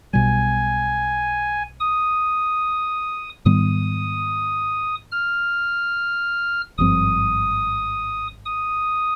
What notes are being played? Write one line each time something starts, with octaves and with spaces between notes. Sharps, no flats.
B1 B2 G3 G#5
D#6
G#2 D#3 G3 B3 D#6
F6
G#1 G2 F3 C4 D#6
D#6